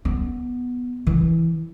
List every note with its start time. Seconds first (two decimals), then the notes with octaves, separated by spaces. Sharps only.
0.05 B3
1.07 E3